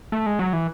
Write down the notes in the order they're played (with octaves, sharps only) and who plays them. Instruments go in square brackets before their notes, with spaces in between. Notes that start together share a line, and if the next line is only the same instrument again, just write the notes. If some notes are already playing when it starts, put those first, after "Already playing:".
[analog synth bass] A3
G#3
F#3
E3